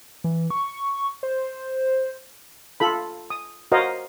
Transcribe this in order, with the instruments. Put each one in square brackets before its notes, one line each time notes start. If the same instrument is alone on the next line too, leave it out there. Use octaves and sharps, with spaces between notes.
[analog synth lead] E3
C#6
C5
[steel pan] F4 A4 B5
D#6
F#4 A#4 C5 C#5 D#5 F5